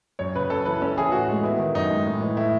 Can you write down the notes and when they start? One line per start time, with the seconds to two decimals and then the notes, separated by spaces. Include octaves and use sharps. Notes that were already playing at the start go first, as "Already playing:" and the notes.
0.19 F#2 C#5
0.35 C#3 B4
0.50 F#2 A4
0.65 E3 B4
0.82 C#4 A4
0.97 E3 G#4
1.12 A2 F#4
1.28 G#3
1.43 B3 E4
1.58 D#3
1.75 F#2 D#4
1.90 G#3
2.06 A2
2.21 E3
2.36 A2 E4